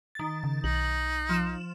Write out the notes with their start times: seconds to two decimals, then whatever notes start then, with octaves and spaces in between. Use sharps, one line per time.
0.15 D#3 A6
0.44 C#3
0.64 B1 D#4 F#7
1.29 F3 E7